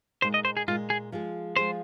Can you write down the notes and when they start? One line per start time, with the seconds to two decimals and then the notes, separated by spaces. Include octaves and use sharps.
0.22 A#2 G#3 D#4 C5
0.34 D#5
0.45 C5
0.57 G#4
0.68 A#2 G#3 D#4 F4
0.90 G#4
1.12 F3 G#3 F4 G#4
1.56 F3 G#3 F4 G#4 C5